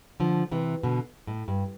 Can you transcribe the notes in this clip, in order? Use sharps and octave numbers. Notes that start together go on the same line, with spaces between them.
D3 F3
C3 E3
B2 D3
A2
G2